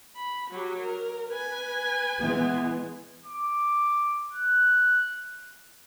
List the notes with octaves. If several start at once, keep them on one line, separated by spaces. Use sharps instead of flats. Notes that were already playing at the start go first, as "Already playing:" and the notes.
B5
F#3 G4
A#4
B4 G#5
E3 G#3 B3
D6
F#6